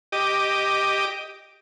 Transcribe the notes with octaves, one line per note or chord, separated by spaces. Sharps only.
G4 D#5 D6